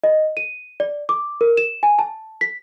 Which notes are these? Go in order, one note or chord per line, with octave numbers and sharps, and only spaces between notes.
D#5
D#7
D5
D6
A#4
E7
G#5
A5
B6